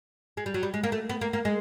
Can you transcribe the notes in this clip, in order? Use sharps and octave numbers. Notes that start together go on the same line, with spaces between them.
G#3
G3
F#3
G3
G#3
A#3
A3
B3
A#3
A#3
G#3